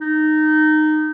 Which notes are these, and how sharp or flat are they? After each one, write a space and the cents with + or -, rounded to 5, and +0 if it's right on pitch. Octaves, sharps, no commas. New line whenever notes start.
D#4 -15